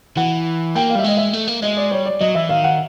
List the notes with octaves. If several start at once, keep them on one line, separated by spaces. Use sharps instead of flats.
E3 F#5
A#3 G5
F5
G3 E5
G#3 D#5
E5
A3
A#3
G#3 D#5
D5
G3 C#5
D5
F#3 D#5
E3 E5
D#3 F5
F#5